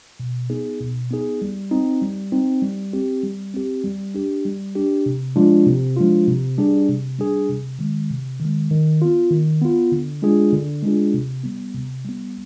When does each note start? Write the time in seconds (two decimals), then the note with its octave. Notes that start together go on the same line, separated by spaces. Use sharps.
0.20 B2
0.50 B3 D#4 G#4
0.81 B2
1.11 B3 D#4 G#4
1.42 G3
1.71 C4 D#4
2.02 G3
2.32 C4 D#4
2.62 G3
2.93 C4 G4
3.23 G3
3.54 C4 G4
3.84 G3
4.15 D4 G4
4.45 G3
4.75 D4 G4
5.06 C3
5.36 F3 G#3 D4 F4
5.66 C3
5.97 F3 G#3 D4 F4
6.27 C3
6.58 G3 D4 G#4
6.89 C3
7.19 G3 D4 G#4
7.49 C3
7.79 D#3 G#3
8.10 C3
8.40 D#3
8.45 G#3
8.71 D#3
9.02 B3 F4
9.31 D#3
9.62 B3 F4
9.92 D3
10.22 G#3 D4 F4 G#4
10.53 D3
10.83 G#3 D4 F4 G#4
11.14 C3
11.44 G3 B3
11.74 C3
12.05 G3 B3